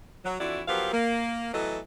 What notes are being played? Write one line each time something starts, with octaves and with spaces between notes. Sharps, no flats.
F#3
F2 E3 D4 E4 F#4 D5
F3 F#3 B3 G4 A#4 F5
A#3
E3 F#3 A3 B3 A4 D#5